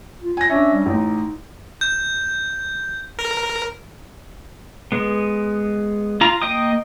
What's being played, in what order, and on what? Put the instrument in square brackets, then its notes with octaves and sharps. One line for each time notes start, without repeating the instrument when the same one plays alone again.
[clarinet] F4
[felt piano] G#5 A#6
[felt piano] C#4 D4 [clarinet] E5
[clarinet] G3
[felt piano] A1 [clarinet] D#4
[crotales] G6
[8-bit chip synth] A#4
[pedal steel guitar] G#3 B3
F4 A#5
A#3 D#5 G5 D#6